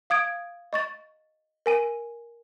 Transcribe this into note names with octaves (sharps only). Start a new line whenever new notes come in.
F5 D#6 G#6 D7
D#5 C#6 A6
A#4 G#5 D#7